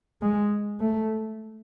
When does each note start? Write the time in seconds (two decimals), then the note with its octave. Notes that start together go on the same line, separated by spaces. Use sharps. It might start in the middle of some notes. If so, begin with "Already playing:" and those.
0.22 G#3
0.81 A3